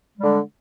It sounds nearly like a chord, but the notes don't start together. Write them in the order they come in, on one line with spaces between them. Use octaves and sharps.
G#3 G3 D3